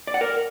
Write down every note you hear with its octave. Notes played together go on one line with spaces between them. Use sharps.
D5
F#5
A#4